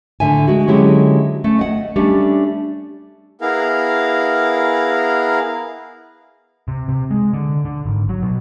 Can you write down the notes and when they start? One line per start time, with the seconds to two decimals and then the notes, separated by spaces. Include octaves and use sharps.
0.20 A2 D3 E5 G#5
0.48 G#3 F#4
0.68 D3 F#3 G#3 C#4 E4 G4
1.44 A3 C#4
1.59 D#5 F#5
1.96 G3 A3 C#4 D4
3.41 B3 E4 G#4 A#4 F5 A#5
6.68 C3
6.89 C3
7.11 G#3
7.33 D3
7.65 D3
7.85 G#1
8.09 F#3
8.22 B2